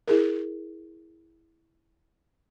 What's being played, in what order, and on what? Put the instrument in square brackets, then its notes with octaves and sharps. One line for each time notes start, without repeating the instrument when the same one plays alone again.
[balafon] E4 G#4 A#4